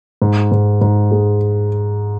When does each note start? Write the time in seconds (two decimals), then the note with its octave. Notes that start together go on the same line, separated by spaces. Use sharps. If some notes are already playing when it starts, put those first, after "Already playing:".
0.22 G#2
0.52 G#2
0.81 G#2
1.11 G#3